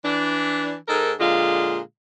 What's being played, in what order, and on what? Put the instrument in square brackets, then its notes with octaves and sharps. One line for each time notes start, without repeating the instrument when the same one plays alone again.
[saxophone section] E3 D4
G#2 D#4 A4 A#4
A#2 D3 G#3 F4 F5